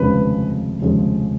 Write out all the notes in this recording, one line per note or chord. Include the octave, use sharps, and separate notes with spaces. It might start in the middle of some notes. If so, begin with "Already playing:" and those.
Already playing: F1 D#2 C#3 F3 G#3 B4
F1 D#2 C#3 F3 G#3